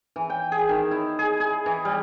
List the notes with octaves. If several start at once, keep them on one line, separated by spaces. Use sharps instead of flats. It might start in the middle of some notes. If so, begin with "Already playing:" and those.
E3
G5
G#4
D#3
E4
G#4
G#4
E3
G3